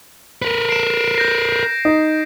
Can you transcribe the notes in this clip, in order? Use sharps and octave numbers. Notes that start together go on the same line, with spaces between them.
A#4 B4
C7 D7 E7
G6 A#6 C7
D#4